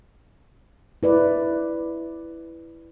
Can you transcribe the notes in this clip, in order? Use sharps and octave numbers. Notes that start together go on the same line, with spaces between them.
E4 B4 D5